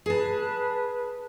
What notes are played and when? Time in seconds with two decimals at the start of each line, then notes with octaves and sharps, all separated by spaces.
0.06 G#4 B4 A5